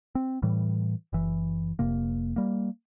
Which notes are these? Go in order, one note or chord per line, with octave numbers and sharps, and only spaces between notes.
C4
A2 E3 G3
F#1 E3
F1 C3 A#3
G3 A#3